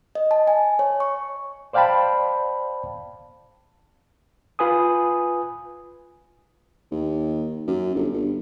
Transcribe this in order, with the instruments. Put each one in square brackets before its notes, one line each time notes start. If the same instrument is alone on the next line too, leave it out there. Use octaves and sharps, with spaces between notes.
[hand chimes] D#5
A5
G#5
C#5
C#6
[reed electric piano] C5 D5 F5 G5 A5 B5
F4 B4 G#5 D#6
[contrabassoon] D#2
F#2
G1
G1